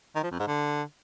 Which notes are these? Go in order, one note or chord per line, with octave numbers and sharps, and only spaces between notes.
D#3
F3
F2
G#2
D3